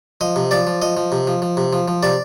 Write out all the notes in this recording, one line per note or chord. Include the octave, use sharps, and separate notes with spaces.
F3 D#5
C3
F3 D5
F3
F3 D#5
F3
C3
F3
F3
C3
F3
F3
C3 D5